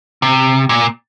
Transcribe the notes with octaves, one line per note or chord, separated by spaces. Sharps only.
C3
A#2